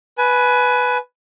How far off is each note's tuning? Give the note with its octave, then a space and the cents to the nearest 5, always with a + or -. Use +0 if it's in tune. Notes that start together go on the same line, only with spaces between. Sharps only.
B4 +0 G#5 +25